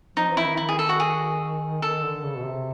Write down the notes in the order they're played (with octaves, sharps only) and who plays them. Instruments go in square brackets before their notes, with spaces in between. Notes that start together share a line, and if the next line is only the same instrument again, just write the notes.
[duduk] F3 [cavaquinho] D#4
[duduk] E3
[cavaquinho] E4
[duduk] D#3
[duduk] D#3 [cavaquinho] E4
[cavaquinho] G#4
A4
F#4
G#4
[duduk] D#3 [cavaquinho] A4
[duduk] D3
C#3
B2
C3